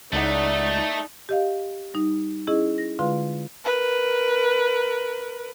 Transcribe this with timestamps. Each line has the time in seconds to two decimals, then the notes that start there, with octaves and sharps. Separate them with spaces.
0.13 C#2 A3 D#4 E4 D5 F#5 B5
1.29 G4 D#5 F5
1.94 G3 D#4
2.47 C#4 E4 G#4 D#5
2.78 A#6
2.99 D3 G#3 F4 B4 F5 C6
3.65 A#4 B4